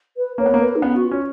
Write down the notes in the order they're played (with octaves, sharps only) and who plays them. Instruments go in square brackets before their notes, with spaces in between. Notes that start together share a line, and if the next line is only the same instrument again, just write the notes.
[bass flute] B4
[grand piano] A#3 [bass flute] C#5
[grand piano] B3
A#3
[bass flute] B4
D#4
[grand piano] B3 [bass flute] C#4
[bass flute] F#4
F4
[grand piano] C#4